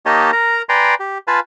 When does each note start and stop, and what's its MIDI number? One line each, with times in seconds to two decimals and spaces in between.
0.06 0.31 58
0.06 0.31 63
0.06 0.31 67
0.06 0.31 73
0.06 0.31 75
0.06 0.31 81
0.33 0.62 70
0.33 0.62 82
0.69 0.95 71
0.69 0.95 74
0.69 0.95 79
0.69 0.95 80
0.69 0.95 82
0.69 0.95 84
1.00 1.18 67
1.27 1.40 65
1.27 1.40 71
1.27 1.40 77
1.27 1.40 80
1.27 1.40 81